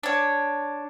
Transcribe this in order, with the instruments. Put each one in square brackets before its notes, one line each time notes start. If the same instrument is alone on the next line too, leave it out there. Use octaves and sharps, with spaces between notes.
[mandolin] D4 C#5